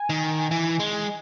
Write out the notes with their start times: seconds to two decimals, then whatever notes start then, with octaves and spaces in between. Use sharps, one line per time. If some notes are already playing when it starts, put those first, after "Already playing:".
Already playing: G#5
0.10 D#3
0.51 E3
0.80 G#3